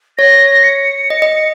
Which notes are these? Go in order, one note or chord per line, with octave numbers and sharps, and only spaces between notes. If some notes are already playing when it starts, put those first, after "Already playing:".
C#5 A#6
C#7
D#5
D#5